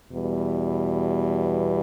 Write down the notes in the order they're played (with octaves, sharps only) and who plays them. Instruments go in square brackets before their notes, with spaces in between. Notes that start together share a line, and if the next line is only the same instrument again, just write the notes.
[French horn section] E2 B2 G3